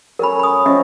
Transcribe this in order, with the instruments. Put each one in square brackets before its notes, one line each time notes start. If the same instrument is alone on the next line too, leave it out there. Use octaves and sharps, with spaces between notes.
[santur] F#3 A3 C#4 [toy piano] A#4 B5
[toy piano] B5 D#6
[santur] F3 A3 [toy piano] C#4 D#5 E5